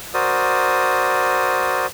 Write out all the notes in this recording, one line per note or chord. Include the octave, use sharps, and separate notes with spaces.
F#4 A#4 C5 D5 D#6